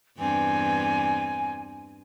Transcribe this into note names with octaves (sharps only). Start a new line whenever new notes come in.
E2 G2 C4 G#5